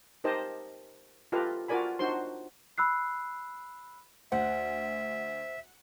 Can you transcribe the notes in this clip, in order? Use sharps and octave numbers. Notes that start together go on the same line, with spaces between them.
D#4 G4 A#4 C5 D#5 A5
F4 G4 A4 B4 D#5 F5
F4 F#4 A#4 D5 G#5 B5
D4 D#4 F#4 C5 C6
B5 E6 F#6 C7
D2 C5 E5 F#5